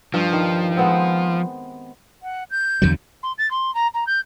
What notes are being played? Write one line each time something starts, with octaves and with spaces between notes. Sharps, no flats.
G2 F3
D#3
G#3 B3 C4
F#5
G6
E2 D3 F#3
C6
A6
C6
A#5
A#5
G6